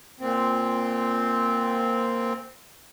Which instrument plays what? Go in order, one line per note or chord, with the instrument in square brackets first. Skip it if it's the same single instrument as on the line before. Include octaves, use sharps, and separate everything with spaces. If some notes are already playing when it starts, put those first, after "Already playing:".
[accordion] A#2 C4